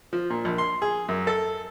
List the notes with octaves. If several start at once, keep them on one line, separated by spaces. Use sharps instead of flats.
F3
A#2
A#1
C6
G#4
F#2
A4